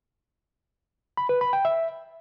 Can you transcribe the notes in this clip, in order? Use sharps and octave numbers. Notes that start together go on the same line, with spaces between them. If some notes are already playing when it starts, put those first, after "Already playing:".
B5
B4
B5
G5
E5